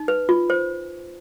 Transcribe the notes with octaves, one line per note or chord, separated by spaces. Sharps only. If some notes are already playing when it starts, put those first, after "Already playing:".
Already playing: D#4
B4
F4
C5